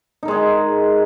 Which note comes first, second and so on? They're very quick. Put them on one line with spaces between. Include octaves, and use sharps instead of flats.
D#4 A#4 G#3 G#4